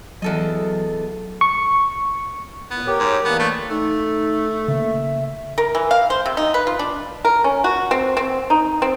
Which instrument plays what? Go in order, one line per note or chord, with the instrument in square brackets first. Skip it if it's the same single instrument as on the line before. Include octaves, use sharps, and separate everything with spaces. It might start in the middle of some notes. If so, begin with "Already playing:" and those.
[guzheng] E2 A4 D#5 [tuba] F#3
[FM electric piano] C#6
[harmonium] E2 A#2 [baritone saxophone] B3
[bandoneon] G4 [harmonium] A#4 C#5
[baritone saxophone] G#2
[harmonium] E3 A#3 D4 [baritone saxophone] B3
[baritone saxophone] A3
[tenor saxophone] A3 [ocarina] D#4
[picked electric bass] C#3 A#3 [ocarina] E5
[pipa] A#4
E3
F5
C5
C3
D#4
B4
F4
D4
A#4
C#4
F#4
C4
C4
D#4
C4